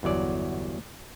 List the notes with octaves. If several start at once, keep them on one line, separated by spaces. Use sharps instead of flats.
G1 E2 F#3 D5